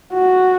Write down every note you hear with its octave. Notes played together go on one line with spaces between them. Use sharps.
F#4